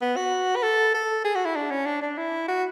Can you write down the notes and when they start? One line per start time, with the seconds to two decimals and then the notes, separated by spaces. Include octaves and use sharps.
0.02 B3
0.16 F#4
0.56 B4
0.63 A4
0.94 A4
1.24 G#4
1.35 F#4
1.45 E4
1.56 D4
1.71 C#4
1.86 D4
2.01 D4
2.17 E4
2.48 F#4